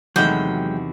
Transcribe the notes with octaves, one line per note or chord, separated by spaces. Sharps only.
E2 C3 D#3 F#3 G#3 A3 F#4 G5